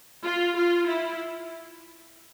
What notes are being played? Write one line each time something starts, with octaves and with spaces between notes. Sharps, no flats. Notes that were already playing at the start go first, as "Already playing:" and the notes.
F4
F4
E4